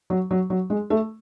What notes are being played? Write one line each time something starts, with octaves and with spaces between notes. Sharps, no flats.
F#3
F#3
F#3
G#3
A3